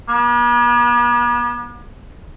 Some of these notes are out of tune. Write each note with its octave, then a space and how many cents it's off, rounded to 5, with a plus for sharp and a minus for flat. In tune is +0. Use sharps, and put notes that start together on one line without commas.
B3 -45